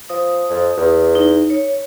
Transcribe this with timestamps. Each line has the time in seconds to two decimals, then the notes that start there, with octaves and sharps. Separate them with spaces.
0.09 F3 D#6
0.49 F2
0.77 E2
1.15 D#4
1.50 C#5